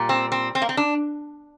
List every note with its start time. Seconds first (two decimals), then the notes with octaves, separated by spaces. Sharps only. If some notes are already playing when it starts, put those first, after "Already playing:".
Already playing: A#2 G3
0.09 C4
0.32 C4
0.55 C4
0.62 A#3
0.69 C4
0.77 D4